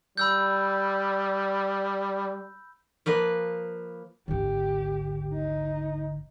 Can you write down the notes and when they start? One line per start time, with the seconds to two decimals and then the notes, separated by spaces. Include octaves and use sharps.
0.17 G3 B5 E6 G6
3.06 F3 A#3 B4
4.28 G#1 D2 G4
5.34 D#4